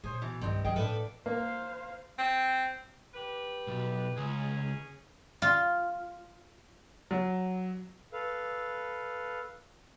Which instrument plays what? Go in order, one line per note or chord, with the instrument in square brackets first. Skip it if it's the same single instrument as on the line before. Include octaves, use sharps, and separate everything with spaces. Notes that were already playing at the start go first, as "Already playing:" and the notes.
[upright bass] A#2 [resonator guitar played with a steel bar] G#4 C5 C#5
[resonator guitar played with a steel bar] B2 E3
[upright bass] C2 G3 [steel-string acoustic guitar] G2 D#3 [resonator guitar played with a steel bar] C4
[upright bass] F#3 D4 [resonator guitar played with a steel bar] G#4 D#5 G5
[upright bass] A2 [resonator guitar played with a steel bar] F3 D4 [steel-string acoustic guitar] A4 B4 E5
[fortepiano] A#3 [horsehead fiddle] C5 F5
[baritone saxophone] C4
[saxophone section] G4 B4
[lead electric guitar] B1
[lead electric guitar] C#2 [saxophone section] C#4 G#4
[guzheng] F4
[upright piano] F#3
[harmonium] A4 B4 F5